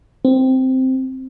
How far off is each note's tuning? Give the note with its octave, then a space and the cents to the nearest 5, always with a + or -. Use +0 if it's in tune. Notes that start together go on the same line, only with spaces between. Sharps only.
C4 -5